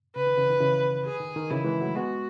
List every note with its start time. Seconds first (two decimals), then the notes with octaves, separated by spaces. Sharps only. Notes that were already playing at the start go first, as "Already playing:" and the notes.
0.15 C#3 B4
0.27 D#3
0.38 C#3 E3
0.50 D#3
0.60 C#3 E3
1.05 G#4
1.20 D#3
1.36 D#3
1.50 C#3 E3 E4
1.65 E3 G#3
1.81 F#3 A3
1.95 G#3 B3 F#4